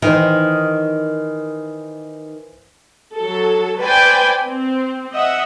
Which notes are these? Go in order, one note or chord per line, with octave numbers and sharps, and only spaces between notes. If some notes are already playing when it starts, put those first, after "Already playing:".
D#3 E3 C5
F#3 A4
B4 C5 D5 G5 G#5 B5
C4
D#5 E5 F#5